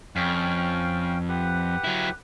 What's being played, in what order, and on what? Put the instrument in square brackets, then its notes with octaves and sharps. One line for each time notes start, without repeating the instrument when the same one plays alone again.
[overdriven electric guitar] F2 [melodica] C#4 F5 G5
[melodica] G4 B4 F#5
[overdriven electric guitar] F#3 E4